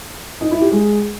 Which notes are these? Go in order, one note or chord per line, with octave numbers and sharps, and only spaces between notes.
D#4
E4
G4
G#3